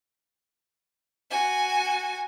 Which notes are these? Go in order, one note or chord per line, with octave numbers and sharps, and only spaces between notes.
F#4 G#5